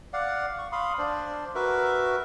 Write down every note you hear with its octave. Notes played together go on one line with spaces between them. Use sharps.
D5 F5 F#5
C#6
F5 B5 C6 D#6
D4 C5 D5
F#4 A#4 B4 E5